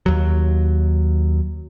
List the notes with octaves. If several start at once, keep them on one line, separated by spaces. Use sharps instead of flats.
D#2 F#3